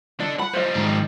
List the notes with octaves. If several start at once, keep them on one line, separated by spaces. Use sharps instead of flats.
D4 A4 D5 D#5
F#5 B5
F3 G3 C5 D#5
G#2 D#3
D#5